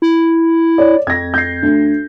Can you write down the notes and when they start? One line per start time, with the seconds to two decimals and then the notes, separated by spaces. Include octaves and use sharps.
0.02 E4
0.78 C#5 D5
1.07 F2 G#6 A#6
1.34 G6 C7
1.63 D2